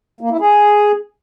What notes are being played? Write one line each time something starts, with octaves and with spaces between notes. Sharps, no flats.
A#3
E4
G#4